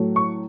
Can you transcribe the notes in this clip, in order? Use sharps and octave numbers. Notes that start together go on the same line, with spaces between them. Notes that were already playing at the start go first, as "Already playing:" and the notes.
Already playing: A2 F#3 A3
C#6